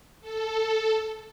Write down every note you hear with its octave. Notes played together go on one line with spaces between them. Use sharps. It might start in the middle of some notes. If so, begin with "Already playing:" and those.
A4